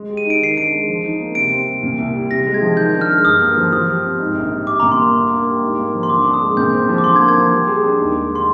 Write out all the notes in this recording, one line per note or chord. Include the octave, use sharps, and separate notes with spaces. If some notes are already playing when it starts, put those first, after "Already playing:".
Already playing: G#3
G4
D#7
D#4
D7
D#3 C7
D4 D7
G#3
F3
D#4
A#3
C3 D7
C4
G3
A#2
C2
G3
C3 A#6
G#3
G#6
F3
D#3 G6
D4
F6
G#3
F6
G2 D#6
A#3
F3
F3 D#6
G4
C4
G#2
A#1
G3
G3 D6
A#2 A#5
C6
A#3
D3
A#3
G3
G#2
A#3
F3
C6
D3 D6
D4
D#6
G#3
A#2 G6
C4
F3
D6
D3 C6
G#6
A#3
G#6
F3
G3
G#4
D4
D#2
G#3
D3 C6